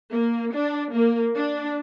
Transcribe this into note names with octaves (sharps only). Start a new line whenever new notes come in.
A#3
D4
A#3
D4